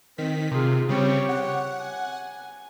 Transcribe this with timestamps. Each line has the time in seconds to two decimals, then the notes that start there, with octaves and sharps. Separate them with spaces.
0.18 D#3 C4 B6
0.51 C3 F4 G#4
0.89 C#3 G3 C4 G4 C#5
1.29 F#5
1.80 G#5